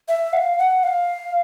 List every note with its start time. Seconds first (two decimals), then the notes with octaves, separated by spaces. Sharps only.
0.08 E5
0.33 F#5
0.37 F5
0.59 F#5
0.83 F5